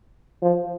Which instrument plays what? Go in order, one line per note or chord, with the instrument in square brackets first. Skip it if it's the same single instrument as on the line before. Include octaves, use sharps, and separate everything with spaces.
[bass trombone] F3